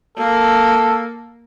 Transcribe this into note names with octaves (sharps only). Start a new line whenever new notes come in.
A#3 A4